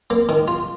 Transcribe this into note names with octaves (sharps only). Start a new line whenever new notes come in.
A#3
D#3
F4